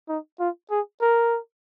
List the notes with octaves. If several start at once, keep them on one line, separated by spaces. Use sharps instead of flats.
D#4
F4
G#4
A#4